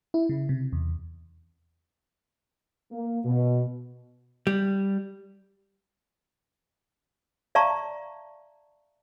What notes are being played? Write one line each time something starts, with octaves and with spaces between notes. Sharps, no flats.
E4
C#3
C3
E2
A#3
B2
G3
D5 E5 F5 A5 A#5 C#6